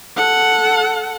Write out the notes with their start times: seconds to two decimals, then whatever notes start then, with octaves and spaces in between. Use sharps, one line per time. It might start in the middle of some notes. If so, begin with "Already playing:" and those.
0.17 A4 F#5